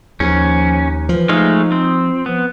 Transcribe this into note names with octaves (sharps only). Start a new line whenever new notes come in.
D#2 F3 C#4
E3 F3
G#3 A3 D#4 F5
C4
F3 B3